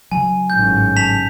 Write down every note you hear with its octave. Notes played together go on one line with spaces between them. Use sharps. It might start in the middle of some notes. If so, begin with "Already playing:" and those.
C#3 F#3 G#5
G#1 A2 C#4 G6
A5 B6 F7